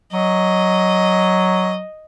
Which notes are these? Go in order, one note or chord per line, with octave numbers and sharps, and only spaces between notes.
F#3 D#5